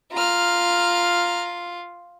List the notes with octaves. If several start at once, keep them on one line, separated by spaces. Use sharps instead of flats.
F4 A#5 F6